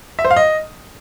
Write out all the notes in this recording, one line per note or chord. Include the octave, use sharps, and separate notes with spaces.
E5
C5
F5
D#5